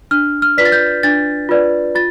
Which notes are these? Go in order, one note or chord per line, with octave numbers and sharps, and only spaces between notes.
D4 F6
F6
F4 B4 D5 B6
A6
G6
D4 A6
F4 B4 D5
F4 A6